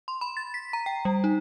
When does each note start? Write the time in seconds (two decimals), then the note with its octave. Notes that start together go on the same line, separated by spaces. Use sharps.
0.08 C6
0.21 B5
0.37 A6
0.54 B6
0.73 A#5
0.86 G5
1.05 G3
1.24 D#4